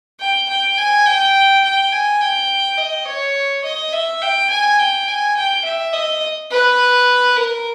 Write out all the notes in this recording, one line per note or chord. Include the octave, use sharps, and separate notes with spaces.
G5
G5
G#5
G5
G5
G#5
G5
D#5
C#5
D#5
E5
G5
G#5
G5
G#5
G5
E5
D#5
B4
A#4